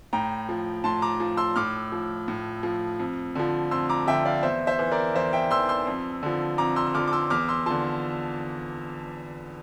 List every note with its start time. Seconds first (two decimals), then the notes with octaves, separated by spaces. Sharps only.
0.13 A2 G5 A#5
0.49 F3
0.84 A2 A5 C6
1.02 A#5 D6
1.20 F3
1.37 C6 E6
1.56 A2 D6 F6
1.92 F3
2.28 A2
2.63 F3
2.99 F2
3.35 D3 F3
3.71 F2 C6 E6
3.89 A#5 D6
4.07 D3 F3 E5 G5
4.25 D5 F5
4.43 E2 C5 E5
4.67 C5 E5
4.79 E3
4.92 A#4 D5
5.14 E2 C5 E5
5.33 E5 G5
5.51 E3 C6 E6
5.69 C6 E6
5.87 F2
6.23 D3 F3
6.58 F2 A#5 D6
6.76 C6 E6
6.87 E6
6.94 D3 F3 D6 F6
7.07 D6
7.13 C6 E6
7.30 E2 D6 F6
7.48 C6 E6
7.66 D3 F3 A5 C6